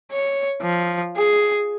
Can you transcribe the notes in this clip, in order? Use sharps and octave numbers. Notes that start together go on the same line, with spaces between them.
C#5
F3
G#4